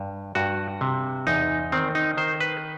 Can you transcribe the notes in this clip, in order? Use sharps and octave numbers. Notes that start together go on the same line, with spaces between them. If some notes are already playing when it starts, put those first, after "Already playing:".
Already playing: G2
G2 F#4
C3
E2 D#4
D#3 C4
D#4
D#3 C5
B4